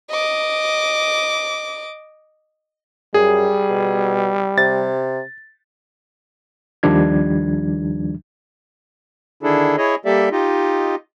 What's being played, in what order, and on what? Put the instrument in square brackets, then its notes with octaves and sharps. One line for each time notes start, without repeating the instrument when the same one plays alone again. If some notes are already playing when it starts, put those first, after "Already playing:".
[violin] D#5 D6
[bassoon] F#2 [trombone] G3 [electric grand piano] G#4
[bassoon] B2
[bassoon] C3 [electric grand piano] A6
[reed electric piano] D#2 D#3 F3 G3 D4 G#6
[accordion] D3 D#3 D4 E4 G#4 A4
E4 G#4 C#5 D#5
G3 A#3 G4 A4 D5 E5
D#4 F4 G4 D#5